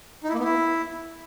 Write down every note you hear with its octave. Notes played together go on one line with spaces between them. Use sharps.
D#4
E4
A#3
B3
E4